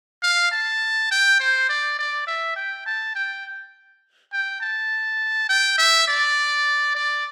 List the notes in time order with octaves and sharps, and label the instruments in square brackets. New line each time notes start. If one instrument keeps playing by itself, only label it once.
[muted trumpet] F5
A5
G5
C5
D5
D5
E5
G5
A5
G5
G5
A5
G5
E5
D5
D5